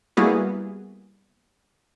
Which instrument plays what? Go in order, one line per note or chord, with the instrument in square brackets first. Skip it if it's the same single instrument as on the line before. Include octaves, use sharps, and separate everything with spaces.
[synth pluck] G3 A#3 B3 E4 F#4 G#4